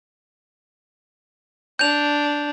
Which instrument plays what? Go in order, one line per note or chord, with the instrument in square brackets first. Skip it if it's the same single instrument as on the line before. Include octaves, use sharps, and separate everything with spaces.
[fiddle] D4 [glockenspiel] G6 F7